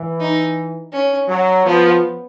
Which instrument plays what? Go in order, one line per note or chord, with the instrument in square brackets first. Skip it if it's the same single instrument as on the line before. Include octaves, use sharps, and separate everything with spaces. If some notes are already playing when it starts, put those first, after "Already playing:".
Already playing: [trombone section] E3
[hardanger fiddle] D#4
C#4
[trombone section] F#3
[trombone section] F3 [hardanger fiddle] B3